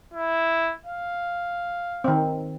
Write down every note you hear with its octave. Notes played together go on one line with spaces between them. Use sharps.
E4
F5
D#3 C4